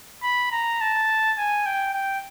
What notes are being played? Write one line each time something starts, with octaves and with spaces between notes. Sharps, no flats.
B5
A#5
A5
G#5
G5
G5